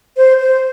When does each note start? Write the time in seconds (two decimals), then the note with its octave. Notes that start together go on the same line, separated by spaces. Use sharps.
0.17 C5
0.40 C5